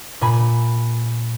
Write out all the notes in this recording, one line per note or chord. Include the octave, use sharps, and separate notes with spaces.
A#2 G#5 B5